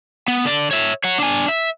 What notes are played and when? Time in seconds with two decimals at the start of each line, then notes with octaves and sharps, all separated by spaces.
0.28 B3
0.45 D3 D5
0.71 C#5 E5
1.04 C#5 F#5
1.18 D4 G#5
1.48 E5